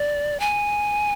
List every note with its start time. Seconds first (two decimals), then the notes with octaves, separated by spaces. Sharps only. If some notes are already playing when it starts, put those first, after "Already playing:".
Already playing: D5
0.40 G#5